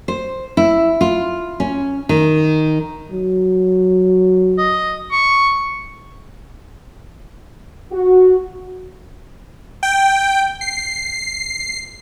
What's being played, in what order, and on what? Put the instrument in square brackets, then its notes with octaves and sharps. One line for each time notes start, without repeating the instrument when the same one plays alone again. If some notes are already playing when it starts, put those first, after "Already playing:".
[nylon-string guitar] C5
E4
F4
C#4
D#3
[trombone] F#3
[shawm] D#5
C#6
[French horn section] F#4
[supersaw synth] G5
C7